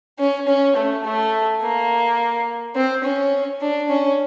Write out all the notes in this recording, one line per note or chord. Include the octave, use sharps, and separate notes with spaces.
C#4
C#4
A3
A3
A#3
C4
C#4
D4
C#4